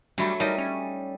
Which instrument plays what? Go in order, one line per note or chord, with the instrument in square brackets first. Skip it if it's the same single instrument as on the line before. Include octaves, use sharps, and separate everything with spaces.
[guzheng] F#3 A3 [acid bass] G3 [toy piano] D4 F#4 B5
[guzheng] G3 D#5 [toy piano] D#4 C#5 E5 [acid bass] A#4
[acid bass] C#4